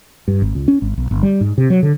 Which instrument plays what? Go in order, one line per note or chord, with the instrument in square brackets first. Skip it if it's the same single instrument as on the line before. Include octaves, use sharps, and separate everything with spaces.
[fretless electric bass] G2
G#1
C#2
C#4
G#1
B1
G1
G3
G#2
C3
F#3
D3